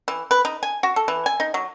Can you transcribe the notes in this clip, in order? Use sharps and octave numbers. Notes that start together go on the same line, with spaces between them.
E3
B4
D#4
G#5
F#4
A4
E3
G#5
D#4
F#3